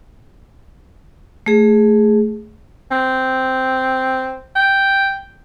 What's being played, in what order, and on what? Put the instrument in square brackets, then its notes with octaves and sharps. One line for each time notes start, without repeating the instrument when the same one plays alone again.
[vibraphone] A3 G#4
[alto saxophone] C4
G5